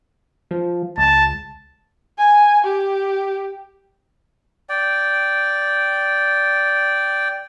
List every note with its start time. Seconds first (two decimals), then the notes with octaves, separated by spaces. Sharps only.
0.51 F3
0.98 C#2 A5
2.18 G#5
2.64 G4
4.69 D5 G5